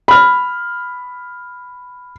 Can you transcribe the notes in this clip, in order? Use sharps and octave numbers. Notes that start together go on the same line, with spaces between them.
B5 F6